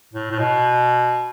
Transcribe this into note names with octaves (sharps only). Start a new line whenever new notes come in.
A2
A2
B2